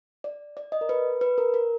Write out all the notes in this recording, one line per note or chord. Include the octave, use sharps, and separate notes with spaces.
D5
D5
D#5
A#4
B4
B4
A#4
A#4